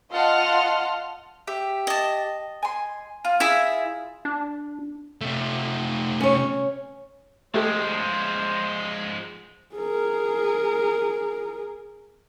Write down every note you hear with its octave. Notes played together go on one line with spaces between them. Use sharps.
F4 D#5 F#5 A5 C6 F6
G4 E5
D#5 A5
G#5 C6
F4
E4 G#4 E5
D4
C3 A3
C#4 C#5
F3 G#3 A3 G4 A4 C5
G#4 A#4